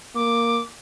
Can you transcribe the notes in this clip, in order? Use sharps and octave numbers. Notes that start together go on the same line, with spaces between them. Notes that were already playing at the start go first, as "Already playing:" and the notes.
A#3 D6